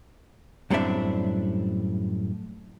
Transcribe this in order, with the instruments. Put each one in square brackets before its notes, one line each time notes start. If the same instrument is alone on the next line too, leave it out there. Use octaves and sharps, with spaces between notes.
[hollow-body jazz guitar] F#2 A2 G3 C4 D4 E5